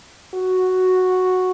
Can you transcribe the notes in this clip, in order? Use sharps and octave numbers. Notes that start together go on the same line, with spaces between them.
F#4